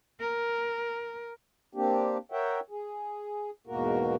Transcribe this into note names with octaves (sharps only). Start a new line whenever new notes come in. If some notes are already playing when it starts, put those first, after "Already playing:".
A#4
A#3 C4 D4 G4
A#4 C#5 E5 F#5 G5
G#4
E2 G#2 B2 A#3 F#4 A#4